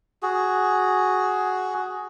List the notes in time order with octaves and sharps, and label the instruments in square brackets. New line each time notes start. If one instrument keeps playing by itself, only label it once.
[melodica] F#4 G#4